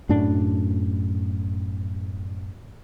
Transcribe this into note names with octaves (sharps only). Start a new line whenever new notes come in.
F#2 A2 D4